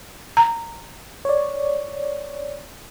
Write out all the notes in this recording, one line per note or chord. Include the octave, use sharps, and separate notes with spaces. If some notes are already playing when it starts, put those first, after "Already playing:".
A#5
C#5 D5